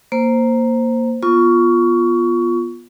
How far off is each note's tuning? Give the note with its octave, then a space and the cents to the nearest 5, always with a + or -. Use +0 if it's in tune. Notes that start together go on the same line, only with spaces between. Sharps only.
A#3 +0 C5 +0
B3 -20 F4 +0 C#6 +20